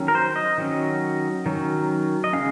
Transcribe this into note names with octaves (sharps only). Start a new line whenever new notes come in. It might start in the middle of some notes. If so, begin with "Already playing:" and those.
Already playing: D#3 F#3 C#4
A#4
C5
D#5
D#3 F#3 C#4
D#3 F#3 C#4
D#5
C#3 G#3 C#4 F5